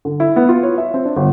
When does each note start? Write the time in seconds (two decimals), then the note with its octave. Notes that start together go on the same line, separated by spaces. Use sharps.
0.05 D3
0.20 E4
0.36 B3
0.49 F4
0.63 C#5
0.78 E5
0.94 C4
1.05 D4
1.17 G1